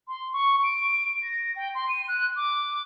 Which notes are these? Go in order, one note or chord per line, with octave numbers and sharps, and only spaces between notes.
C6
C#6
D7
A#6
G5
C6
D#7
F#6
D6